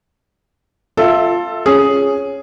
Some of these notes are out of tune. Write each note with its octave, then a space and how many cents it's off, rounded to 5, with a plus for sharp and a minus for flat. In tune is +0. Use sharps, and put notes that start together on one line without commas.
F4 +10 A4 +10 E5 -15
C#4 +0 G#4 +0